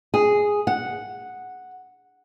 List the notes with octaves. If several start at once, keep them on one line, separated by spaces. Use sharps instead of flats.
G#4
F#5